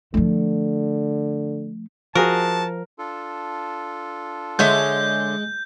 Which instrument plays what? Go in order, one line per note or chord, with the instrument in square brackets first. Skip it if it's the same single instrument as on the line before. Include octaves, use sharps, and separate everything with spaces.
[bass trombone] D3 [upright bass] F3 A3
[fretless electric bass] F3 [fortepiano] F#4 G#4 [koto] A#4 [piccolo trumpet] A5
[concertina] D4 F4 A4
[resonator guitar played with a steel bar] D3 C#5 E5 [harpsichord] G#3 [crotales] G6